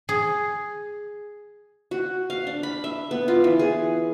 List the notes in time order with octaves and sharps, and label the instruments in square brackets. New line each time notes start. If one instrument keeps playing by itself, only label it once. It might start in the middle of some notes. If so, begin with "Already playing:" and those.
[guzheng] G#4
[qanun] F#4
F5
D4
B5
E5
B3
F4
E3
G#4